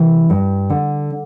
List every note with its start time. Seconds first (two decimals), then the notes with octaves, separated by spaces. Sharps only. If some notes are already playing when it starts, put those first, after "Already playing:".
Already playing: C3 E3
0.30 G2
0.70 D3